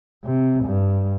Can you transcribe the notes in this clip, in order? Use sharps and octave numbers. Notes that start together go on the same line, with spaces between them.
C3
G2